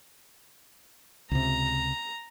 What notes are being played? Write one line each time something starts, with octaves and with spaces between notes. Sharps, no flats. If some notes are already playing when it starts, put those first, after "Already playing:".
C#2 C3 A#5